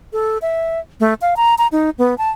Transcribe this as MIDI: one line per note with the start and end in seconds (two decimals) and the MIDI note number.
0.13 0.38 69
0.42 0.80 76
1.00 1.14 57
1.21 1.34 77
1.36 1.54 82
1.58 1.67 82
1.72 1.90 63
1.98 2.17 59
2.18 2.30 81